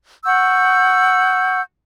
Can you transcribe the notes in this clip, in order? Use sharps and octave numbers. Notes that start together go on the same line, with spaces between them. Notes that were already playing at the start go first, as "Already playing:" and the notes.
F#5 C#6 E6 G6